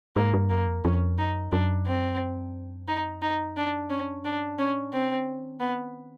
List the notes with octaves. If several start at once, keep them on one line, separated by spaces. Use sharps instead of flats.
G#2 A#3
G2
F#2 A#3
F2
F2 C#4
F#2 D#4
F#2 D4
C4
D#4
D#4
D4
C#4
G2 D4
A2 C#4
C3 C4
D3
D#3
B3